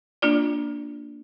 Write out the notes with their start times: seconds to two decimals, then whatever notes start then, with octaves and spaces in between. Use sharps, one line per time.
0.22 A#3 D4 F4 D5